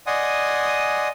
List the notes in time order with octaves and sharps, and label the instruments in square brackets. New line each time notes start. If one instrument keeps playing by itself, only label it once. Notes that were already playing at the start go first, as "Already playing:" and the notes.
[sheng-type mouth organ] D5 D#5 F#5 G#5 C6 D#6